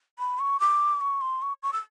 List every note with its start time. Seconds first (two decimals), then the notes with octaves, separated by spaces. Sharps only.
0.19 B5
0.39 C#6
0.60 D6
1.01 C#6
1.21 C6
1.42 C#6
1.63 C#6
1.73 E6